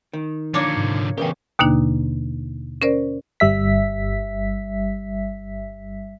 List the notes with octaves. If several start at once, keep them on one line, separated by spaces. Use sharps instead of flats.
D#3
D3 F3 A#3 D4 C#5
G#2 C3
E2 G#2 C#3 C#4 G4 A#4 B4 G5
D#2 B2 D3 A#3 D4 D#4
C#4 A#4 C5 D5
G1 G3 E5 B6